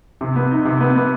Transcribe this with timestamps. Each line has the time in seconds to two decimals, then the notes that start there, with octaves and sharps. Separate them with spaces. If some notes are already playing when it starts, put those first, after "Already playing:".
0.21 C3
0.36 B3
0.51 D#4
0.65 C3
0.80 B3
0.95 B3